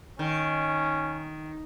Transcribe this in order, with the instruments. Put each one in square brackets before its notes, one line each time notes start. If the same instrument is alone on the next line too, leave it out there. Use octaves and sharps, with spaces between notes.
[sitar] D#3 [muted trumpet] C#4